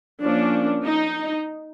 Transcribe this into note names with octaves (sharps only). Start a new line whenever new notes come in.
F3 A#3 C#4 D4
D#4